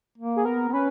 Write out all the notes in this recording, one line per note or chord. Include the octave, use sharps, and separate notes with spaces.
A#3
G#4
B3 A#4
B3
C#4 B4